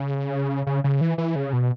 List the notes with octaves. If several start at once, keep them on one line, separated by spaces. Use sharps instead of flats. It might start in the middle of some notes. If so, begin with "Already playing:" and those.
Already playing: C#3
C#3
C#3
E3
E3
C#3
B2